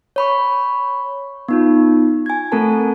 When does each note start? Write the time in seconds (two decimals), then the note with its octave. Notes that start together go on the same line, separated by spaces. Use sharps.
0.16 C#5 B5 C#6
1.48 B3 D#4 F4
2.26 G#5 G#6
2.52 A3 C4 A4 A#4 G#5 A5